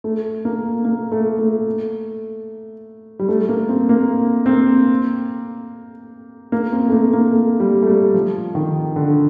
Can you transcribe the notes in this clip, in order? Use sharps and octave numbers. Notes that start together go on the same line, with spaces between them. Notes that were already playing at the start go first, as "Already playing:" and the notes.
A3
A#3
A#3
A3
A3
G3
A3
A#3
C4
A#3
C4
A#3
A#3
C4
A3
A#3
A#3
A3
G3
A3
G3
F3
D#3
D3